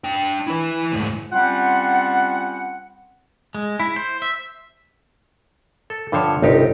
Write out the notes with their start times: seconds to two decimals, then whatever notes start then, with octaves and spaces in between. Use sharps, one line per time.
0.04 D4 G5
0.47 E4 B4
0.92 D2 G#2
1.32 G3 C4 C#4 F4 F#5
3.55 G#3
3.80 E4
3.96 C5
4.22 E5
5.90 A4
6.12 G2 D3 F3 C5 C#5
6.42 G1 C2 D#4 G4